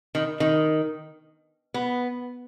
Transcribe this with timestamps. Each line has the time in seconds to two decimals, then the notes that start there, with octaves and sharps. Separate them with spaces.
0.15 D#3
0.40 D#3
1.74 B3